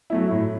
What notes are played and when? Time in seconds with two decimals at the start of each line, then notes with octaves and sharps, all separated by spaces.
0.10 F#3 A3 E4
0.31 A2